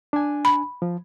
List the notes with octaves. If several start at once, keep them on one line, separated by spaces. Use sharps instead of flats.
D4 G#5
B5
F3